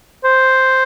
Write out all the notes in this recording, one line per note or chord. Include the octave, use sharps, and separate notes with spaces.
C5